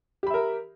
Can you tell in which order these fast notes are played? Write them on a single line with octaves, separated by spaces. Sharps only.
G4 B5 E5 A#4